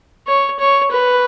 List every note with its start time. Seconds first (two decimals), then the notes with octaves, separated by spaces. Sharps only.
0.27 C#5
0.60 C#5
0.92 B4